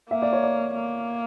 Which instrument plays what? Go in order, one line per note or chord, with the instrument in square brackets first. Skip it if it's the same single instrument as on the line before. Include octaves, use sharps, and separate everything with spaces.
[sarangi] A#3 [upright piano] E5
[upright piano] D5
C#5
D5
[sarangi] A#3